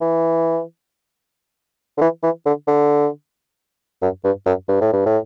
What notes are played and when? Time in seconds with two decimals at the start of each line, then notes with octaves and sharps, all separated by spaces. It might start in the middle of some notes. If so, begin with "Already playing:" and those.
0.01 E3
1.97 D3
2.01 E3
2.23 E3
2.45 D3
2.67 D3
4.02 F#2
4.24 G2
4.46 F#2
4.68 G2
4.81 A2
4.93 G2
5.05 A2